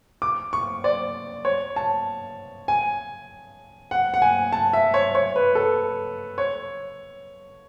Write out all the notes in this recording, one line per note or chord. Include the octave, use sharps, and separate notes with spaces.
D6
C#6
D5
C#5
A5
G#5
F#5
F#5
G#5
A5
E5
C#5
C#5
B4
A4
C#5